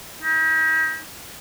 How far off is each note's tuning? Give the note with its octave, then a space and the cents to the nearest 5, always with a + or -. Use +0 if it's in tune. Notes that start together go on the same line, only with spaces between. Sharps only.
D#4 +40